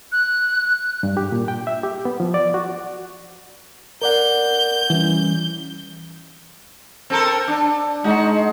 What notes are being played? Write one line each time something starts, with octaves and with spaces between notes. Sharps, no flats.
F#6
G2
G4
A#2
G5
E5
G4
B3
F3
D5
F#4
A#4 D5 F#5 G6
E3 G3 C#4
C4 A4 A#4
D4
G#3 D#4 F#4